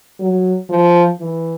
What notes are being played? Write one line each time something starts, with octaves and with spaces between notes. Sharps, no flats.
F#3
F3
E3